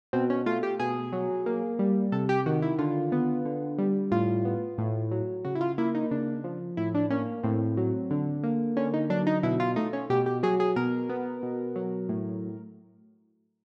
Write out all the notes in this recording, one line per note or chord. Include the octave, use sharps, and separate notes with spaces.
B2 C4
C#4
A3 F4
G4
B2 G#4
F#3
A#3
G3
C3 A4
G4
D#3 F#4
E4
D3 F4
B3
D3
G3
A2 F4
B3
A2
F#3
C#3 F#4
E4
F4
A#3 E4
D#4
C#3 D4
F3
A2 E4
D4
A#3 C#4
A2 C4
F#3
D3
A#3
D3 C#4
D#4
F#3 D4
D#4
B2 E4
F4
A3 D#4
C#4
B2 G4
G4
F#3 G#4
G#4
B2 A#4
B3
B2
F#3
A2